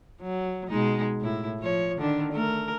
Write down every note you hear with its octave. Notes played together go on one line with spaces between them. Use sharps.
F#3
B2 G#3 D#4
A2 E4
F3 C#5
D3 D#3 D4
A3 A#4